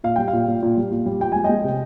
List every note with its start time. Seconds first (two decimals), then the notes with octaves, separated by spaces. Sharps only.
0.04 A#2 F5
0.16 G3 G5
0.28 F5
0.33 A#2
0.48 A#2
0.62 A#2
0.77 G3
0.91 A#2
1.06 G3
1.20 F3 G5
1.32 G#3 G#5
1.44 G#3 D#5 G5
1.64 C3